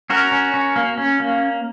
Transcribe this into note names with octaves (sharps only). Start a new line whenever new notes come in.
C#4 F#4 A#4
C#4
C#4
A#3
C#4
A#3